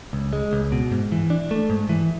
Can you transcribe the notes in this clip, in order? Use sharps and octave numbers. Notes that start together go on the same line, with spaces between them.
C#2
G#3
C#2
B2
G#2
E3
D4
A3
G#2
E3